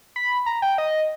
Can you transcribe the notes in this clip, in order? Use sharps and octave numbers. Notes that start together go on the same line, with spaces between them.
B5
A#5
G5
D#5